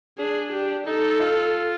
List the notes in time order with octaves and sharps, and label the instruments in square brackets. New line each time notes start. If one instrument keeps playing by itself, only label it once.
[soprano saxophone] D4 [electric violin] G#4
[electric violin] G4
[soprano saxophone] D#4 [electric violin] A4
[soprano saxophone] F4